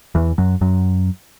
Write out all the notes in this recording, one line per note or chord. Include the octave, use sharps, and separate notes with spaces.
E2 E3
F#2 F#3
F#2 F#3